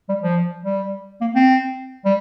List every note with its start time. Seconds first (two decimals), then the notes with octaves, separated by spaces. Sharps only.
0.09 G3
0.23 F3
0.65 G3
1.21 A#3
1.35 C4
2.05 G3